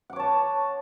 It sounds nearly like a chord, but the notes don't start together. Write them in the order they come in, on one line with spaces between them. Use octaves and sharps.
F#5 D6 C#5 A5